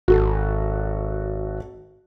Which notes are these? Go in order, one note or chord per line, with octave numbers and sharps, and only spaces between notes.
G#1 F#4 A4